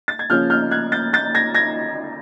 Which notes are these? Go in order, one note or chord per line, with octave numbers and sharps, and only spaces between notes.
A6
G#6
C#3 F3 A#3 C#4 F6 G6
F6 G6
F#6 G#6
G6 A6
G6 A6
G#6 A#6
G#6 A#6